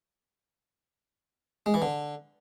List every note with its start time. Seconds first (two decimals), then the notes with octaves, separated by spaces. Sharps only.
1.66 G#3
1.74 E3
1.82 D3